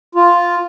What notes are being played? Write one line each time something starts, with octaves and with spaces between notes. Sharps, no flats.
F4